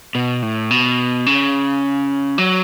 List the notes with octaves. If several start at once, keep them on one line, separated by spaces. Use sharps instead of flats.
B2
A2
B2
C#3
F#3